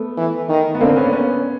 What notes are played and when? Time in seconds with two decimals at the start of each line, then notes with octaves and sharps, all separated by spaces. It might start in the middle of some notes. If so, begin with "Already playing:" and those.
Already playing: A3 B3
0.17 E3
0.49 D#3
0.75 B3
0.81 D3 A#3 C4
0.96 B3 C#4
1.06 D4
1.13 B3 C#4